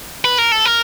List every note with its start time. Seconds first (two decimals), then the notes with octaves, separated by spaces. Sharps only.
0.25 B4
0.38 A#4
0.52 A4
0.65 A#4